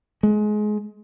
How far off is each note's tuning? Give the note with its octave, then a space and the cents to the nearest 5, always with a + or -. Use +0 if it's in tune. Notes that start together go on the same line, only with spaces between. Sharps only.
G#3 +25